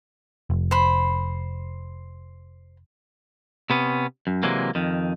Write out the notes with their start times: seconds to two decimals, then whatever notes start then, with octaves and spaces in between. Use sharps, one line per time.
0.50 F1
0.71 C5 B5
3.70 C3 B3 C#4
4.27 F#2
4.43 C3 E3 F#3 G#3 A#3
4.75 F2 D#3